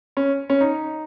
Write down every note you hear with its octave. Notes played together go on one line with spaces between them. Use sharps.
C#4
C#4
D#4